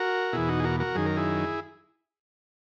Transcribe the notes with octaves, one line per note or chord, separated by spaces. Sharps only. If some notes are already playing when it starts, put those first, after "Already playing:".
Already playing: F#4 A#4
E2 B2 E4 G#4
D#4 F#4
G#4
F#4 A#4
F#4 A#4
F#2 D#3 G#4
A#4
E4 G#4